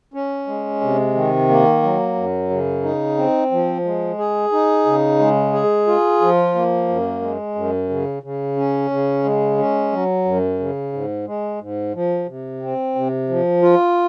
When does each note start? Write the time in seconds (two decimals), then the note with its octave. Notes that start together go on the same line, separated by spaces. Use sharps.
0.14 C#4
0.47 G#3
0.81 C3
1.15 D#3
1.49 A#3
1.83 F#3
2.16 F#2
2.50 C#3
2.83 D#4
3.17 C4
3.51 F3
3.85 G#3
4.18 G#4
4.52 D#4
4.86 C#3
5.19 G#3
5.53 G#4
5.87 F4
6.21 F3
6.55 A#3
6.88 F#2
7.22 G#3
7.55 F#2
7.89 C#3
8.23 C#3
8.57 C#4
8.91 C#3
9.24 G#3
9.58 C#4
9.92 F#3
10.25 F#2
10.59 C#3
10.93 G#2
11.27 G#3
11.60 G#2
11.94 F3
12.28 C3
12.62 C4
12.95 C3
13.29 F3
13.62 F4